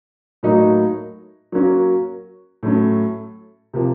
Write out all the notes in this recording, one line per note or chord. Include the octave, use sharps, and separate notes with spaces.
A2 F#3 A#3 D#4 F#4
F#3 A#3 C#4 F#4 A#4
A2 F#3 A3 C#4
C3 F3 A#3